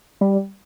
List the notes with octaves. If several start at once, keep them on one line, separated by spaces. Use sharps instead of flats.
G3